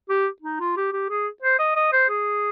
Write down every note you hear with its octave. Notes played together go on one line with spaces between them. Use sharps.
G4
D#4
F4
G4
G4
G#4
C5
D#5
D#5
C5
G#4